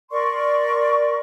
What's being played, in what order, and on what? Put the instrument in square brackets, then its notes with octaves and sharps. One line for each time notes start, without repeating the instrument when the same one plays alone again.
[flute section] A#4 D5 C6 C#6